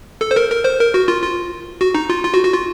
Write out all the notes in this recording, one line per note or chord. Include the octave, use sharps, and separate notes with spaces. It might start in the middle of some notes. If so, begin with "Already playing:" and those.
A4
C5
A#4
A#4
C5
A#4
F#4
F4
F4
F#4
D#4
F4
F4
F#4
F#4
F4